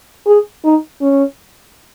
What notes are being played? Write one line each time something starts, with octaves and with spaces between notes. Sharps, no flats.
G#4
D#4
C#4